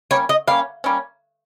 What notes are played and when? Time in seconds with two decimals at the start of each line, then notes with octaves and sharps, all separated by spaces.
0.11 G3 A#3 C#4 C#5
0.29 D#5
0.47 G3 A#3 C#4 F5
0.84 G3 A#3 C#4